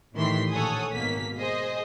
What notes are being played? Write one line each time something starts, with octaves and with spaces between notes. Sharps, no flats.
A2 D#3 E3 G4 C6 B6
A#1 A4 C#5 F#5 G#5 D#6
G#1 B2 A#3 B6
G#4 C5 D#5